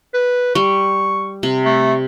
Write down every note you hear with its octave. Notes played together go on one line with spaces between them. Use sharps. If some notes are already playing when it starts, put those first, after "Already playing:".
B4
G3 C#6
C3
A3